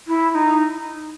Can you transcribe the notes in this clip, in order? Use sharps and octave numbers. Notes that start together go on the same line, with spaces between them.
E4
E4
D#4